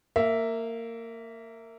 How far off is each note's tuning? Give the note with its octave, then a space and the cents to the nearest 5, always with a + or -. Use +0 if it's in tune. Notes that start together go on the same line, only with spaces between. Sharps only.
A#3 -20 E5 +0